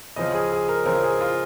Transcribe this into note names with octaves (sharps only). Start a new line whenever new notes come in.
C#3 F3 C4 D#5
G#4
G#4
A#4
C#3 F3 C4 A#4
G#4
F4